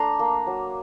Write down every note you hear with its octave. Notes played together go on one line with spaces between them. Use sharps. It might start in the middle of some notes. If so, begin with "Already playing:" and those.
Already playing: A3 D4 A#5 C6
A#3
F#3